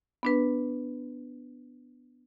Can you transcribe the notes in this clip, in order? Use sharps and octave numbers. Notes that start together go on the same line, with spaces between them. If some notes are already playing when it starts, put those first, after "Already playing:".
B3 D4 B4